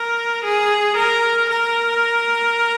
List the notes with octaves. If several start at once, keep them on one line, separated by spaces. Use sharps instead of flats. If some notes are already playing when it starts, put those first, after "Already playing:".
Already playing: A#4
G#4
A#4
A#4